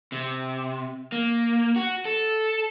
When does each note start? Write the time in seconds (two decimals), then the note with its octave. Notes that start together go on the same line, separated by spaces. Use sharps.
0.12 C3
1.12 A#3
1.76 F#4
2.05 A4